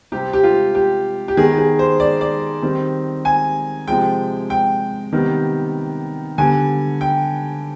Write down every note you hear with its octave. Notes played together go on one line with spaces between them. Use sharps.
C3 G3 C4 G4
G4
F4
G4
G4
D#3 B3 G#4
G#4
C5
D5
D5
D#3 G3 C4
G#5
C3 F3 G#3 G5
G5
C3 D#3 G3 B3
D3 G3 B3 G#5
G5